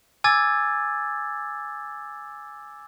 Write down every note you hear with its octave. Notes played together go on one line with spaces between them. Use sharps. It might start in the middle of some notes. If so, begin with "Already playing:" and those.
G#5 D6 E6 G#6 A6